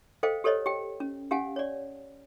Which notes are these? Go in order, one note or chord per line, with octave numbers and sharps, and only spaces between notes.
A4 C5 D#5 F5 G5
G4 A4 C5 C#5 D#5
G4 G5
C#4
C#4 G4 F5 F#5 G#5
C#5 D5